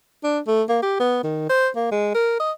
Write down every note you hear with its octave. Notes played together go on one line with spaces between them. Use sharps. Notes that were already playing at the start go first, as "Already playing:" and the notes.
D4
A3
A#3
G4
B3
D#3
C5
A#3
G#3
A#4
D#5